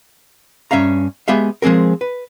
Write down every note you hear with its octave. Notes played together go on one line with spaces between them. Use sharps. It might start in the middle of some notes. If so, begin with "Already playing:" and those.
G2 C#4 E5 F5 A#5
G#3 B3 G4 E5 F5
F3 G#3 C4 G#4 A#4
B4